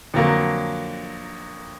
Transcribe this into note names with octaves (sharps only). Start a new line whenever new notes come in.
F2 D3 F#3 A#3